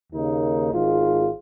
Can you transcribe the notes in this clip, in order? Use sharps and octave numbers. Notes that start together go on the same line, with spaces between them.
D#2 C#3 A#3 D#4
G#1 G#2 G#3 F4